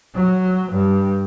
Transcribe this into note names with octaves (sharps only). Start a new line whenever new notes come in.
F#3
G2